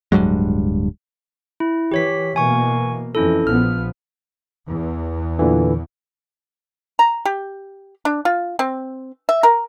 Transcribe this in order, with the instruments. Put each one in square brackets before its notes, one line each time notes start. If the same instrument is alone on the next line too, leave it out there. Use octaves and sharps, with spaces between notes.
[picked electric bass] D1 G2 F#3 G#3
[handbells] E4
[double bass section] E3 [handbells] G4 C#5 B6
[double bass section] B2 E3 A#3 [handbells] G#5 C#6
[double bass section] F2 E3 [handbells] C#4 E4 A4
[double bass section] A#1 F3 B3 [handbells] F6
[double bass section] E2
[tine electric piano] A#2 D3 E3
[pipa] A#5
G4
D4
F4
C4
E5
A#4